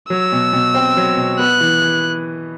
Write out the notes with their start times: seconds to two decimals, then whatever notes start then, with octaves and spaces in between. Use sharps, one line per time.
0.10 F#3 E6
0.32 B2
0.53 B2
0.74 C4
0.97 F#3
1.17 B2
1.39 B3 F#6
1.60 E3
1.82 E3